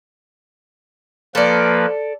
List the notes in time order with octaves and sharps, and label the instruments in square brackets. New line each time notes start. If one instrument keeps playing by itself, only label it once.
[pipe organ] F3 A#3 B4 [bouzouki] A4 D5